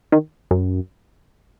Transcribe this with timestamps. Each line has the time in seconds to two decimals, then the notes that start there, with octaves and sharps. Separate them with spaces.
0.12 D#3
0.51 F#2